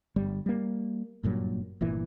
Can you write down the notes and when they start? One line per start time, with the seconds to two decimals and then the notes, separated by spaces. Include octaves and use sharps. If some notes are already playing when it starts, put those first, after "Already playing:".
0.16 G1 G3
0.46 G3 A#3
1.23 F#1 G2 A#2 F#3
1.81 G1 A#2 E3